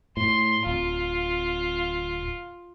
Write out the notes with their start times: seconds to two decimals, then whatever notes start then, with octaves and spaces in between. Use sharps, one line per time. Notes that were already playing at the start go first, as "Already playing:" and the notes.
0.17 A2 C6
0.66 D1 F4